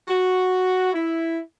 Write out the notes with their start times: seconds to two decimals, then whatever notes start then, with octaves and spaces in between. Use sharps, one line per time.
0.08 F#4
0.93 E4